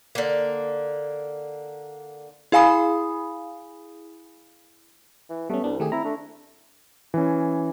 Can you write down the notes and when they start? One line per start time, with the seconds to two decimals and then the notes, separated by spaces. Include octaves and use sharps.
0.15 D3 A#3
2.52 E4 G#4 F5 G#5 B5 D#6
5.30 E3
5.50 G3 A3 B3 C#4
5.64 C2 D4
5.80 D#3 A3 G4 G#4
5.92 C4 E4 A#5
6.04 A3 D4
7.14 E3 C#4